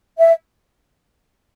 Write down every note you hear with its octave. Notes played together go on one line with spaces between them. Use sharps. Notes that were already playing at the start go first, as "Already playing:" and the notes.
E5